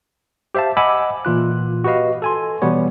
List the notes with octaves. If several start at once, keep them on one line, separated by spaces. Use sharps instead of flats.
G4 C5 E5 F5 A5
D#5 F#5 G#5 B5 D6 E6
A#2 E3 F4 F#6
F#4 G4 B4 D#5 F5
A4 G#5 C6
B2 E3 G3 B3 C#5